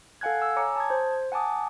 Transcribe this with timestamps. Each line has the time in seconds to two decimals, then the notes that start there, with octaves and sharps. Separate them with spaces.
0.21 A4 F5 F#5 G#5 F#6 G#6
0.42 E6
0.56 C#5 G#5 A#5 D6 C#7
0.76 A5 D#6 G#6
0.90 C5
1.32 F#5 G#5 A5 D6 D#6